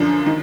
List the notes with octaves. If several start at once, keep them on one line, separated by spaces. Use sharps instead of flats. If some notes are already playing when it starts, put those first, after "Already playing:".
Already playing: F#2 D3 F3 D4
D#3